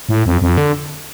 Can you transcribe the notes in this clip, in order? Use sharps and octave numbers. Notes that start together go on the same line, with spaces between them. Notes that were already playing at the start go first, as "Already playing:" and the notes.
A2
F2
F2
D3